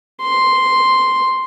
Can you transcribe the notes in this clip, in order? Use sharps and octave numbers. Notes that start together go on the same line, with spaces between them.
C6